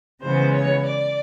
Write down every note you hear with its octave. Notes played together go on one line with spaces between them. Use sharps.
C#3 E3 G#3 B3 C5
C#5
D5